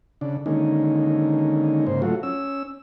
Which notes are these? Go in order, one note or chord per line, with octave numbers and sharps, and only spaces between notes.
C#3 D4
D3 D#3 G#3 A#3 C#4 D#4
G#2 C#3 A#3 C5
F#3 A3 F4 F#4
C#4 E6